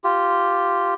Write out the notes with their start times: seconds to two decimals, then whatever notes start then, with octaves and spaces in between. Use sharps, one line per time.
0.04 F4 G4